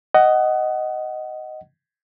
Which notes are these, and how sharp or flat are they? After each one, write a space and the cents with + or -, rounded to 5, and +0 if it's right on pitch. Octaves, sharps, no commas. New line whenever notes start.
D#5 +0 F#5 +20